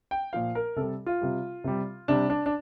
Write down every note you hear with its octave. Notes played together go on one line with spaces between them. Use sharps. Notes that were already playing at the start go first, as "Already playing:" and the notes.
G5
A#2 F3 F5
A#4
C3 G3 A4
F4
C3 G3
C3 G3
C3 G3 D4
D4
D4